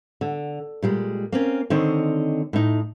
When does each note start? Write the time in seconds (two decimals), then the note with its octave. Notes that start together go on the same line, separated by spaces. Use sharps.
0.21 D3
0.82 A#2 G3 G#3
1.32 A#3 C4 C#4
1.70 D3 D#3 C4 C#5 D#5
2.53 A2 D#4